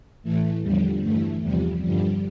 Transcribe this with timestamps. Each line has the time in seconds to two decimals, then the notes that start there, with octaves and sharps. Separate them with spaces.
0.23 A2 E3 A3
0.62 E2 D3 F3 G3
1.02 G2 E3 A3
1.42 E2 C3 F3 G3
1.82 G2 D3 F3 G3